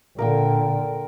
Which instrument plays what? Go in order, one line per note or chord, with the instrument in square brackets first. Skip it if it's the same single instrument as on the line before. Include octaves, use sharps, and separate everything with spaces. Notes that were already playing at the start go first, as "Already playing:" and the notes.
[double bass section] A#2 D3 [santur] A#4 F5 G5